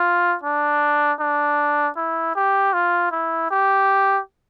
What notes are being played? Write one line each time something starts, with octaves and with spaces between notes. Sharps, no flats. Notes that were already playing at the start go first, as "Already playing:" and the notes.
Already playing: F4
D4
D4
E4
G4
F4
E4
G4